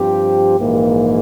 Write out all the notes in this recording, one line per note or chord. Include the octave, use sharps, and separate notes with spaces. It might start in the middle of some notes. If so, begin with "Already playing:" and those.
Already playing: G2 F3 C4 G4
A#1 G#2 E3 A#3